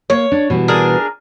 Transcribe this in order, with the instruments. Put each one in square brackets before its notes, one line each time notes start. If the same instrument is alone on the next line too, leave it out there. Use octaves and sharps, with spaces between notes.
[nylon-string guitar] A#3 [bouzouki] C#5
[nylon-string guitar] D4
B2 E3 G3
[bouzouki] D4 G#4 A#4